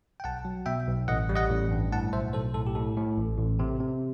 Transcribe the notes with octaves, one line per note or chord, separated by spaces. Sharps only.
G5
B1 F#5 A5
F#3
B2 E5 G5
B1
A1 D#5 F#5
G3
D#5 F#5
A1
G2
A2 F#5 A5
B1 C5 E5
B1 A4 C5
A2 A4
G4
A2 A4
A2
A1
A1
C3
C3